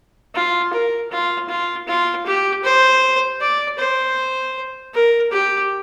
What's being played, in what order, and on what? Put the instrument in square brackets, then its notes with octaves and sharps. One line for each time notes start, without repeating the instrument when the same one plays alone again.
[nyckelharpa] F4
A#4
F4
F4
F4
G4
C5
D5
C5
A#4
G4